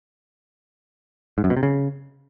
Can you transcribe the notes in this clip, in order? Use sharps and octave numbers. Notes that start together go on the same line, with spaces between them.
G#2
F#2
B2
C3
C#3